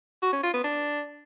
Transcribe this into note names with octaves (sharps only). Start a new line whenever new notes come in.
F#4
C#4
F4
B3
D4